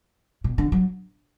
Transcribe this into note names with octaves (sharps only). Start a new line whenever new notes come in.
B2
D3
F#3